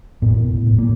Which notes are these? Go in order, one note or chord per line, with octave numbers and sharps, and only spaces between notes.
A2 B3
A2
A2
A#3